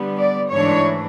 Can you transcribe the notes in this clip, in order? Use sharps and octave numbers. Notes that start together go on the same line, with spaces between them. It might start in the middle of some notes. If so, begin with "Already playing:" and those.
Already playing: D3 G3 B3
D5
G#2 E3 A3 D4 C#5